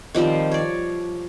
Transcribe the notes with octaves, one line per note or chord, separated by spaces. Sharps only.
D#3 F3 G3 C4
C#5 D5